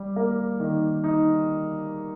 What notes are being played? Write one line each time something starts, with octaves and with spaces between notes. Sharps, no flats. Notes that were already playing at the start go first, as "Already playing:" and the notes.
Already playing: G3
A#3
D#3
D#4